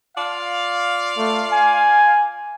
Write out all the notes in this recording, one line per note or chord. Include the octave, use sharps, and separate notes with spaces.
F4 D5 F5
A3
G#5